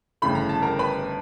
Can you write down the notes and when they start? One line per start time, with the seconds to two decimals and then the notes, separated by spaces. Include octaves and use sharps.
0.22 G1 F2 C#3 E3 A3 B5
0.35 A#5
0.49 A5
0.62 A#4 A#5
0.79 B4 B5